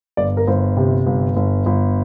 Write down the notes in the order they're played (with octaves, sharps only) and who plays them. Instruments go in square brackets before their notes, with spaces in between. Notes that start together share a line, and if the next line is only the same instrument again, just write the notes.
[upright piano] G1 D5
A#4
G1 C5
C3
G1
G1
G1